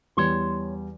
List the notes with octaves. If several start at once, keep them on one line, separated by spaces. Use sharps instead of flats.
E2 G3 C#5 C6